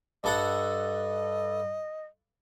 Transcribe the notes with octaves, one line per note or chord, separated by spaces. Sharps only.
G2 A4 D#5 F#5